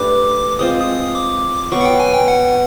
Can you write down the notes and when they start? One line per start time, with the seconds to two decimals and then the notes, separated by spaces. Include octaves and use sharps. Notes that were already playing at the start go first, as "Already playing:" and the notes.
Already playing: A3 D4 G4 B4 D6
0.59 G#3 C4 F4 D#6
0.80 D#6
1.15 D6
1.72 B2 F#3 B3 C#6
1.81 F#5
1.86 G5
2.00 G#5
2.14 G5
2.28 F#5